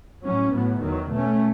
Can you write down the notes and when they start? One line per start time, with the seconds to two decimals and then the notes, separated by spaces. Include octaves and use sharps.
0.24 A2 F#3 C#4
0.52 A2 F#3 B3
0.81 E2 D#3 F#3
1.11 B2 A3 C#4